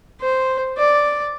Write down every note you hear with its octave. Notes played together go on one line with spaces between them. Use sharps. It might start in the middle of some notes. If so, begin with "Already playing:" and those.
C5
D5